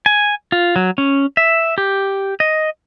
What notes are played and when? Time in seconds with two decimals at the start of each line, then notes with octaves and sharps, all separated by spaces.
0.06 G#5
0.52 F4
0.76 F#3
0.98 C#4
1.37 E5
1.78 G4
2.40 D#5